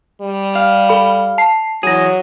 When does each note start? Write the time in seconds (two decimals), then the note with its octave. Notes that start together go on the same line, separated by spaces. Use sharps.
0.21 G3
0.55 F5
0.89 A4 B5
1.38 A5 C7
1.83 E3 F#3 G#4 A#6 D#7